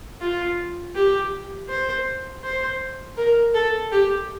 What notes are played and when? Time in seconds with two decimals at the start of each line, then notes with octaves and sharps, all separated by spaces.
0.21 F4
0.95 G4
1.69 C5
2.43 C5
3.17 A#4
3.54 A4
3.92 G4